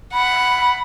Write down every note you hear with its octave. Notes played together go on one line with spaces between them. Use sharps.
F#5 B5